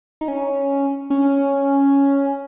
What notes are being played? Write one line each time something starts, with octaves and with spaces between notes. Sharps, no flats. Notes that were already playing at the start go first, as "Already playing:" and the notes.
D#4
C#4
C#4